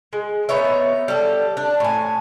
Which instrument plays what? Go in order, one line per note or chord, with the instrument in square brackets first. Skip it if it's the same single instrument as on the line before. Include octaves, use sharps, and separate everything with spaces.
[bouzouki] G#3
B3 D#4 C#5 E5
G3 A4
D4
A2 G#5